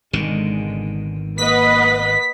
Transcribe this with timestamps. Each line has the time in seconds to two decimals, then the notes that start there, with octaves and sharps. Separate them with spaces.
0.13 G#1 B2 D3 D#3 G#3
1.38 A#3 B4 D#5 F#5 B6